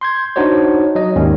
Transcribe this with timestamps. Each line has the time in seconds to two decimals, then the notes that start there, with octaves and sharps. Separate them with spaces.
0.01 C6 G6 G#6
0.36 D4 D#4 F#4 C5 C#5
0.95 F#3 D#5
1.16 D#2 G#2 D#3 G3 A#3 C#4